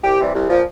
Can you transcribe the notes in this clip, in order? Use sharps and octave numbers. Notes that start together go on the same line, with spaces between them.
C2 G4
C3 E3 G3
C2
A#2 F3